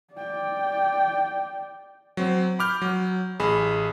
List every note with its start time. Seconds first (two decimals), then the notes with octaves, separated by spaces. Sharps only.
0.14 D5 G5
2.17 F#3 C4
2.59 B5 D6 F6 G6
2.82 F#3
3.40 A1 G#4 B5